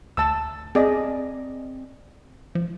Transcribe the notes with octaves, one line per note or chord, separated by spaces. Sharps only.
D2 A5 E6
C4 G#4 D5 D#5
F3